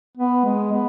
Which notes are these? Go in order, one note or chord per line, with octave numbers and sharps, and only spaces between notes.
B3
G#3
B3